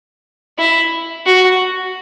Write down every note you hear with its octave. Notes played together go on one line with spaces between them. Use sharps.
E4
F#4